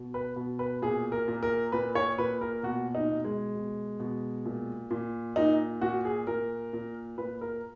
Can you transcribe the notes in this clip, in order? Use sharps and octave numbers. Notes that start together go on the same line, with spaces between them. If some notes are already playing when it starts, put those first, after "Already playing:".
Already playing: B2
B4
B2
B4
A#2 G#4
A#4
A#2
A#4
A#2 B4
C#5
A#2 B4
A#4
B2 F#4
D#4
B2
G#3
B2
B2
A#2
A#2
A#2 D#4
A#2 F#4
G#4
A#2 A#4
A#2
A#2 B4
A#4